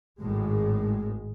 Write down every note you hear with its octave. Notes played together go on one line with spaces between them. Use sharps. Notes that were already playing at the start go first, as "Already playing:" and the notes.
G#1 A2 G#3